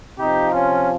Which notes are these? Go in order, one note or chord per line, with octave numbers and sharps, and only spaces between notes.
C3 F3 D#4 G4
C#4 F4